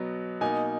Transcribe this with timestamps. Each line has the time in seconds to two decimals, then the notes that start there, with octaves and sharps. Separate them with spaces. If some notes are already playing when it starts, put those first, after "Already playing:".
Already playing: B2 F#3 B3
0.41 B2 A#3 D#4 G#5